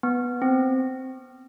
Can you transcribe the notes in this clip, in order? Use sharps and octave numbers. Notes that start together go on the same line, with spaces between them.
B3
C4